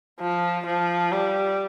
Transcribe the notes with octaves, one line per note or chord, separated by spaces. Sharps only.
F3
F3
G3